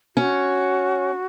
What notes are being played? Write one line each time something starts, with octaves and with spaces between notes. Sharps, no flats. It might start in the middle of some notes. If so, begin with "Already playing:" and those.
C#4 F#4